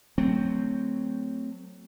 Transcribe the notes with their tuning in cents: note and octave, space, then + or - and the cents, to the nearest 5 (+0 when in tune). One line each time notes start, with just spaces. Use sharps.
F#3 +0 A3 +25 C4 +0